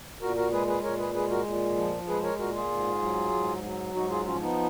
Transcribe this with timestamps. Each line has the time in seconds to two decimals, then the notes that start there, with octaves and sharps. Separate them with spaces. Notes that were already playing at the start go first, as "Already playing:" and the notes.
0.22 A#2 F#4 A#4
0.36 F#4 A#4
0.52 G#3 G#4 B4
0.68 G#4 B4
0.83 A#2 A#4 C#5
0.99 G#4 B4
1.14 G#3 G#4 B4
1.30 F#4 A#4
1.45 A#2
1.76 F3
2.08 G#3 G#4 B4
2.23 A#4 C#5
2.39 A#2 F#4 A#4
2.55 F4 G#4
2.70 G#2
3.02 F#3
3.33 G#2
3.64 F#3
3.95 G#2 D#4 F#4
4.10 F4 G#4
4.26 F3 C#4 F4
4.42 B3 D#4